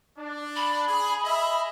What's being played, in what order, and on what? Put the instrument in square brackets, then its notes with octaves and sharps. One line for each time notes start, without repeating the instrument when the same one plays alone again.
[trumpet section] D4
[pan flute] B5
[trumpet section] G#4
G#4 D#5 E5